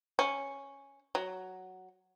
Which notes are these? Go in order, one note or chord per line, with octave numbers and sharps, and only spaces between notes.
C#4
F#3